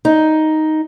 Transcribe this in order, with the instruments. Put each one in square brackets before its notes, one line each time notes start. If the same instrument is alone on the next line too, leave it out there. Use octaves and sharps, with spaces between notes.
[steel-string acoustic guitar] D#4